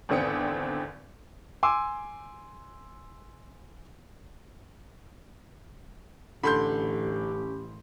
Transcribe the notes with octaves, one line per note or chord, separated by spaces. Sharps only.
G#1 E2 D3 C4 D#6 C#7
G#5 C6 D6 E6
A1 D3 C#4 G4 B5 C6 G6